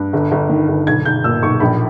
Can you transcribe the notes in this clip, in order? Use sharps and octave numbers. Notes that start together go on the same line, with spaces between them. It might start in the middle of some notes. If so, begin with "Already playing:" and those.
Already playing: G2
G1
G1
D#3
G1
B1 G#6
B1 G6
A#2 E6
B1 C#6
A#1 B5